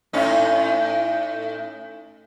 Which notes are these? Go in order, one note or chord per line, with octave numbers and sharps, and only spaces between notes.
A2 C#4 D#4